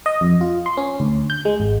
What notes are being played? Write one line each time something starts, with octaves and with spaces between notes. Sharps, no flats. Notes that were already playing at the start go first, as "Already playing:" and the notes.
D#5
F2
F4
C6
C#4
D2
G6
G#3
G#1